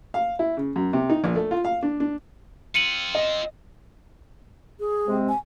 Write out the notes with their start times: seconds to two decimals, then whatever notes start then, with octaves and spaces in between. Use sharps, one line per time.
0.14 F5
0.39 E4
0.57 C#3
0.76 F#2
0.93 C3
1.10 D#4
1.24 A#1
1.36 A3
1.51 F4
1.65 F5
1.83 D4
2.00 D4
2.75 C4 F4 C#7 D#7 F#7
3.15 D#5
4.80 G#4
5.07 C3 G#3 C4
5.29 G#5